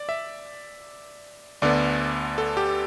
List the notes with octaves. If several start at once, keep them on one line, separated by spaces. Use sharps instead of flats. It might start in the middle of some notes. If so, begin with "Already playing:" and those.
Already playing: D5
E5
D2 D3 B3 D5
A4
G4